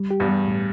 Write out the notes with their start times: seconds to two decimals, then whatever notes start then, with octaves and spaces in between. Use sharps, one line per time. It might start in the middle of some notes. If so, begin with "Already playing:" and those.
Already playing: G3
0.11 G4
0.20 E2 G2
0.28 G3
0.47 A2